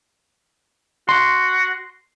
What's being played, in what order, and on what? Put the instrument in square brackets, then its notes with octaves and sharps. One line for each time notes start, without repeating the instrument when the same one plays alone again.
[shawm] F#4 [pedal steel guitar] C6